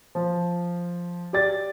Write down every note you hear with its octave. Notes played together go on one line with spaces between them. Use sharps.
F3
G4 D5 A6